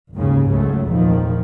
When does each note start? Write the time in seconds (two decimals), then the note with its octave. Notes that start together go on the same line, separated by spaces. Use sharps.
0.13 F#1 D#2 G#2 C#3
0.47 G#1 C#2 C#3 F#3 A3
0.87 F1 A#1 E2 D#3 F3